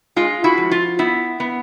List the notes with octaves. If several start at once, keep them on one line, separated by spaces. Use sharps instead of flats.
G#3 F4
E4 F#4
F3
F4
B3 E4
B3